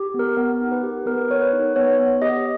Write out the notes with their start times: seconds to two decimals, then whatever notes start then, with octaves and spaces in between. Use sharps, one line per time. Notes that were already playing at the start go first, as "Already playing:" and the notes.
Already playing: G4
0.14 B3
0.19 A#4
0.37 B3 A#4
0.60 D#4
0.72 B4
0.83 G4
1.06 B3 A#4
1.30 B3 C#5
1.41 B4
1.53 D#4
1.76 B3 C#5
1.99 B3
2.22 G4 D#5